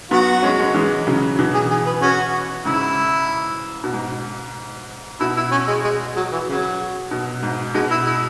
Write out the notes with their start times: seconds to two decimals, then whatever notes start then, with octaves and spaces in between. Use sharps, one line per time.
0.11 F#3 B3 F#4
0.43 G#3 C#4
0.59 G#3 C#4
0.74 E3 G#3
1.07 C#3 F#3
1.39 B2 E3
1.54 G#4
1.70 G#4
1.86 B4
2.02 C#4 F#4
2.65 G#2 C#3 E4
3.84 B2
3.94 G#2
5.20 B2 E4
5.37 E4
5.52 C#4
5.67 G#3
5.84 G#3
6.16 F#3
6.32 E3
6.48 C#3 F#3
7.11 B2
7.43 G#2
7.75 B2 G#3
7.91 E4
8.06 E4